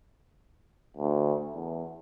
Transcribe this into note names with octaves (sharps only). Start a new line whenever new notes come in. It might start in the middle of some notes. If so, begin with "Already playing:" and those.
D2
E2